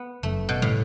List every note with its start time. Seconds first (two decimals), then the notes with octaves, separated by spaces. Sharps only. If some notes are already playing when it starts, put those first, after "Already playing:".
Already playing: B3
0.23 F#1 F#2 C#3 A3
0.49 B2
0.62 A2 C#3 G3